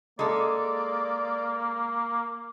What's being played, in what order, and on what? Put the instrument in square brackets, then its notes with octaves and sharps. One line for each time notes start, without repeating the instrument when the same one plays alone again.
[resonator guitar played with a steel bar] G#3 A4 [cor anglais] A#3 [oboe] D5